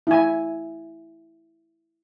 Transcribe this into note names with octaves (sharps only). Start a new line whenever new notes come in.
E4 G#5